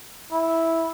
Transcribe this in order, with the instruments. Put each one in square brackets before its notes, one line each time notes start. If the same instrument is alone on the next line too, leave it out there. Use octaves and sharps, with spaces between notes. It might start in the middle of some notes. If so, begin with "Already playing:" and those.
[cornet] E4